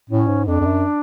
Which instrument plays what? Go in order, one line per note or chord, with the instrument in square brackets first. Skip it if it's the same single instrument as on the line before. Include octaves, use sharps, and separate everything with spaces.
[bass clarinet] A2 [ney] C#4
[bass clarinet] G#2
[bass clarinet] F2 [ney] D4
[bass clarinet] F2
F#2